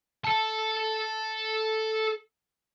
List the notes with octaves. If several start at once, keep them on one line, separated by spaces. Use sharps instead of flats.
A4 A5